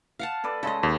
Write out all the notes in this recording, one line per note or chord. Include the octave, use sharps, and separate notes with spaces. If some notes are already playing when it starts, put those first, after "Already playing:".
F5 F#5 A5
A4 B4 D5
C#3 G#3 A4 D#5
D#2 G#4